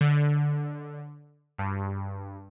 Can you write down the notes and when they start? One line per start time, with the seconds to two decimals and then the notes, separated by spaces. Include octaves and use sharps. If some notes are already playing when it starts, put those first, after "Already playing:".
0.01 D3
1.58 G2